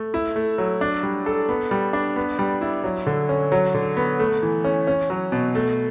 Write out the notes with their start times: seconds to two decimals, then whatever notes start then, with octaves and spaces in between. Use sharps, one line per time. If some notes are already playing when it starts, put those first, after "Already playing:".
Already playing: A3
0.14 E4
0.36 A3
0.58 F#3
0.81 D4
1.03 G3
1.26 A4
1.49 B3
1.71 G3
1.93 D4
2.16 B3
2.39 G3
2.61 E4
2.84 F#3
3.07 D3
3.29 C#4
3.52 F#3
3.74 D3
3.97 B3
4.19 A3
4.43 E3
4.64 C#4
4.87 C#4
5.10 F#3
5.32 B2
5.55 A3